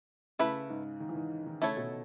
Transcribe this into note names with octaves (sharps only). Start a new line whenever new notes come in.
C#3 A3 E4 B4
G#2
D#3
E3
D#3
D#3
C#3 A3 E4 A4 C#5
B2